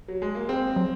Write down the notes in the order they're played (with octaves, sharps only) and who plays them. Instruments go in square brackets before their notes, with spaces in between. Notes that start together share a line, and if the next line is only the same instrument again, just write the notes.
[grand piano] F#3
G#3
A#3
[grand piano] C4 [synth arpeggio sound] G#4
[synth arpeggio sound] F#3